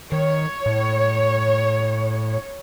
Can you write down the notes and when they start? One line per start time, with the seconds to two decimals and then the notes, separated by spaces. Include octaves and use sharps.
0.12 D#3 C#5
0.66 A2